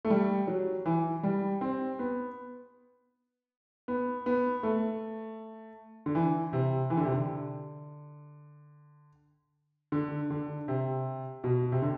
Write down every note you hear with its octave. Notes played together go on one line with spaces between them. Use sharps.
A3
G3
F#3
E3
G3
C4
B3
B3
B3
A3
D3
E3
C3
E3
D3
C3
D3
D3
D3
C3
B2
C3
D3